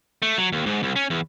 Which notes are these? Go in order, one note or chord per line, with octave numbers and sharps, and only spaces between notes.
A3
F#3
D#2
G#2
C2
C#4
E2